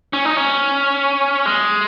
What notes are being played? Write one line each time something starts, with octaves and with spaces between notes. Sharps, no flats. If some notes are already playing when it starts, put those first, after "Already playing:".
C#4
D#4
C#4
G#3